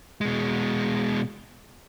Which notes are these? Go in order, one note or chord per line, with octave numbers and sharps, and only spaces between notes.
B2 G#3